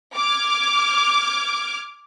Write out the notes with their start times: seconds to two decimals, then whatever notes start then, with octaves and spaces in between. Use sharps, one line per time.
0.15 D6 F6 G#6